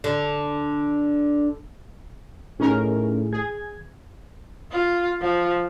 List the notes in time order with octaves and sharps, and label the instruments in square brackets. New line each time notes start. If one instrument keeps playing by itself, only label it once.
[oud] D3
[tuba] A2 [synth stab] C#4 D#4 A#4 [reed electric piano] G#4
[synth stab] G#4 [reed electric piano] G#6
[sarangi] F4
F3